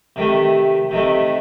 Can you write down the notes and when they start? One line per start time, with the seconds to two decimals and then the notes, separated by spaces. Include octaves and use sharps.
0.16 C3 D#3 A3
0.91 C3 D#3 A3